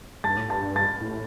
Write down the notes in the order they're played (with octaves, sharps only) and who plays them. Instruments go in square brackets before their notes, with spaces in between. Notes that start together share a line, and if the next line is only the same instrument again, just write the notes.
[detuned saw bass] G2 [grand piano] A5 A6
[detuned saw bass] A2
[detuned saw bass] G2 [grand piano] A5 A6
[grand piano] A5 A6
[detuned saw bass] A2